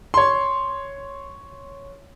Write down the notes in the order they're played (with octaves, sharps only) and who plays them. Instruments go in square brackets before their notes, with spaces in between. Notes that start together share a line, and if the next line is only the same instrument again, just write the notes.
[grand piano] C#5 C6